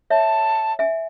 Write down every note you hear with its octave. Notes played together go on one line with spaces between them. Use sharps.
C#5 E5 A5
E5 G#5